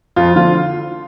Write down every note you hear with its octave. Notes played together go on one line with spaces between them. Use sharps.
F2 F4
D3 F3 F4